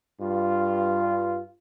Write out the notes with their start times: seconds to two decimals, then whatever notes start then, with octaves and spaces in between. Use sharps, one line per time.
0.21 G2 F4